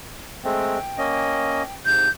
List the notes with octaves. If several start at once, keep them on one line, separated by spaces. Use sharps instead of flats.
G#3 A3 C4 G5
A#3 C#4 D#5
G#2 C3 G6